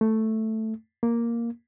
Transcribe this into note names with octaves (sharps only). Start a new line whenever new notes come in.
A3
A#3